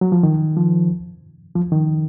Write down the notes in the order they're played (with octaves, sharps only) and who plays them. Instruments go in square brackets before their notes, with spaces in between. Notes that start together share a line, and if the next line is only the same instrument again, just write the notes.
[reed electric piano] F#3
F3
D#3
F3
F3
D#3